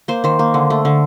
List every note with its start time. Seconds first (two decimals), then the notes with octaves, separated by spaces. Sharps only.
0.08 A#3 C5
0.24 D#3 C5
0.39 A#3
0.54 D3
0.70 A3
0.85 D3